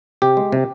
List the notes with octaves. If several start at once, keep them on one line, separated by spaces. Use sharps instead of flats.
C3 G4
G#3
C3